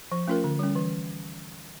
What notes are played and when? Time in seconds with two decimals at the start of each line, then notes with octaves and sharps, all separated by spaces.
0.12 F3
0.28 A3 C#4 F4 A#4
0.44 D3
0.59 G3 C#4
0.75 E3